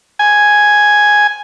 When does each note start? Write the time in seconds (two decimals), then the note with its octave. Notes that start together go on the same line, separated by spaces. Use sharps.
0.19 G#5